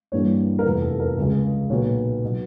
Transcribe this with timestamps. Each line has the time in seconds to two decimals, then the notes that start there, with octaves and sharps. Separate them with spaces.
0.12 G2 E3 G3 A#3 C#5
0.59 A#4
0.65 F1 E2 C3 F3 B4
0.82 A4
1.00 A#4
1.17 C#2 C#3 F3 G#3
1.69 B1 A#2 F#3 B3 C#5
2.24 B2 F#3